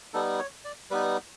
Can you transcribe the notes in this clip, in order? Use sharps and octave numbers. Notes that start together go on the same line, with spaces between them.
G3 B3 D#4 A4
C#5
D5
G3 B3 D#4 B4